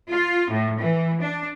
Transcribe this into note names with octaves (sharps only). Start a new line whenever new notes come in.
F4
A2
E3
D4